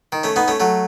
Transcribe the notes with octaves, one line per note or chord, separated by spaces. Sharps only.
D#3
A3 C#4
B3 D#4
A3 C#4
F#3 A3